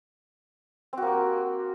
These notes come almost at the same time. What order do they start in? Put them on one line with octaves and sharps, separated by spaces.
C4 F#4 A#3 G4